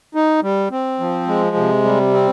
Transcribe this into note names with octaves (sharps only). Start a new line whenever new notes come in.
D#4
G3
C4
F3
G#3
C3
G3
C4